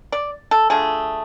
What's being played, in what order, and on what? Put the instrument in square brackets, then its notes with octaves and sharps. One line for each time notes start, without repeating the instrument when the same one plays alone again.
[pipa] D5
A4
D3 F3 A3 G#4